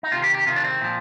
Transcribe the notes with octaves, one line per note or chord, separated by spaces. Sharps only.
D#4
C3 D#3 F4
G4
G4
C3 D#3 F4
D4
C4
A#2 F3